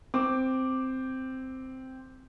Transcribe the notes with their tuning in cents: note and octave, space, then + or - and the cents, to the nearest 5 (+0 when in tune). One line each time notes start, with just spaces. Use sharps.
C4 -5 D6 +0